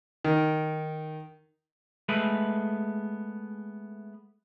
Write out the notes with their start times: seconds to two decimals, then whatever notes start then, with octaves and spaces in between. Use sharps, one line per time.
0.25 D#3
2.09 G#3 A3 B3 B4